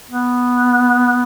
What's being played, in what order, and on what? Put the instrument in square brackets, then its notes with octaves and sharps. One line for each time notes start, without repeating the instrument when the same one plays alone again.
[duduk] B3